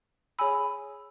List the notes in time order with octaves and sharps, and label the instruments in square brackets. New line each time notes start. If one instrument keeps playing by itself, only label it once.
[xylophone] G#4 C#5 G#5 B5 E6